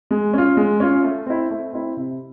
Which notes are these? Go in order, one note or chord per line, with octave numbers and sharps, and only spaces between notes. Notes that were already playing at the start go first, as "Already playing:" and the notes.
G#3
C#4 F4
G#3
C#4 F4
A3
C4 E4
A3
C4 E4
C3